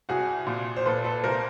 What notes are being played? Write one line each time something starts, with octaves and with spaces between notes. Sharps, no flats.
C2 F#4 G#4
A#2
C5
A#2 A4 B4
A4 B4
C2 A#4 C5